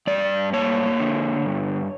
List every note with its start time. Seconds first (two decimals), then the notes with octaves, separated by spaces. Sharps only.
0.07 G2 D5
0.53 A#3 C#5
1.00 D3
1.45 G2